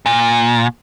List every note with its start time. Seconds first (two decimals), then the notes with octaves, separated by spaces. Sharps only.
0.06 A#2